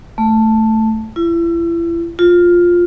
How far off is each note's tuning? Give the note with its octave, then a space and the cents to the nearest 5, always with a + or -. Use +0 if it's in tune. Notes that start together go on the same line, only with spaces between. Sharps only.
A3 +5
E4 +35
F4 +5